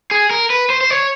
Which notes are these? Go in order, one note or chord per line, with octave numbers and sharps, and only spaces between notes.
G#4
A#4
B4
C5
C5
C#5